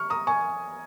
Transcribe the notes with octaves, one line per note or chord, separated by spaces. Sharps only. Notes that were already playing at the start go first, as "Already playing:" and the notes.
Already playing: C#6 F6
A#5 D#6
G#5 C#6